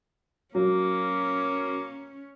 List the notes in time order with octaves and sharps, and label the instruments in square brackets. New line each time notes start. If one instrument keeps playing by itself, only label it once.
[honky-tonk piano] F#3 [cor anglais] A#3 [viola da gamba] C#4